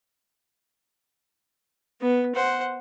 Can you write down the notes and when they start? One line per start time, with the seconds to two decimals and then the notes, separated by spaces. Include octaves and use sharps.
2.01 B3
2.35 C5 F#5